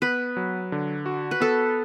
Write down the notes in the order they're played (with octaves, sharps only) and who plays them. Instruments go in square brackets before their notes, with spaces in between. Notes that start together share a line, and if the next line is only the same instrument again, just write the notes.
[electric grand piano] B3 [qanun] B4
[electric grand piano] F#3
D3
F#4
[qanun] B4
[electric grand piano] B3 [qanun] A4